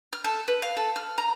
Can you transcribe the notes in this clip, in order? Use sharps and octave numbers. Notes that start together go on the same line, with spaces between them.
F6
A4
B4
F5
A4
F6
A#5